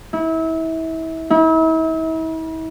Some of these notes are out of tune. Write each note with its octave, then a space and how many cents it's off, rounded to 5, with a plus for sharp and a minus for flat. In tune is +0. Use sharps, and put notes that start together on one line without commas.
E4 -30
E4 -40